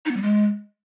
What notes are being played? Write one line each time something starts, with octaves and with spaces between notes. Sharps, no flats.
D#4
B3
G3
G#3